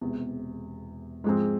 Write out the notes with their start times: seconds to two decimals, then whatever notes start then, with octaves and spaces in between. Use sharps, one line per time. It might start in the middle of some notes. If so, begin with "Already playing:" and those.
0.01 E1 E2 C3
1.24 G#2 F3 G#3 C4